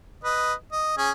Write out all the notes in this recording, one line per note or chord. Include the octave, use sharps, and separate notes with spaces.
B4 D#5
D#5
C#4 G#4